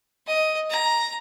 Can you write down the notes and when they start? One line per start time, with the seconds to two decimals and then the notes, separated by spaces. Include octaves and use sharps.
0.27 D#5
0.70 A#5